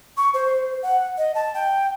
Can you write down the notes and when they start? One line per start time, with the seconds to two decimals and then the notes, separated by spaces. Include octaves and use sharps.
0.17 C#6
0.34 C5
0.83 F#5
1.18 D#5
1.35 A5
1.54 G5